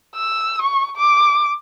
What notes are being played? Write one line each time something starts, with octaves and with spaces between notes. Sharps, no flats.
E6
C#6
D6